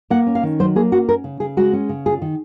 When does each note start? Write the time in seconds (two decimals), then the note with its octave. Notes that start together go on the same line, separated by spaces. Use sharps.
0.10 A#3 F#5
0.27 C#4
0.35 F5
0.43 D#3
0.59 F#3 C5
0.76 A#3 G#4
0.92 C#4 F#4
1.08 C#4 A#4
1.24 C#3
1.40 C#3 G#4
1.57 G#3 F#4
1.73 C#4
1.89 C#3
2.06 F4 G#4
2.22 D#3